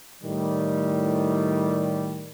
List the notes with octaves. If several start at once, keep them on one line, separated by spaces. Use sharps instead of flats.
A2 D#3 G3